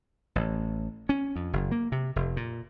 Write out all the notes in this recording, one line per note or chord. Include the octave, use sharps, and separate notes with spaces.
A1
C#4
F2
F#1
A#3
C3
F1
A#2